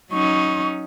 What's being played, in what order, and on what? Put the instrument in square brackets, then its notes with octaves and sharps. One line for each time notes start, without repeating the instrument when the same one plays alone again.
[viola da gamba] F#3 C#4 D#4 [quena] C#6